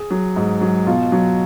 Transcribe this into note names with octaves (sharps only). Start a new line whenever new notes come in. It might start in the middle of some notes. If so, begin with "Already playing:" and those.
Already playing: G#4
F#3
G#2
F#3
B2 F4
F#3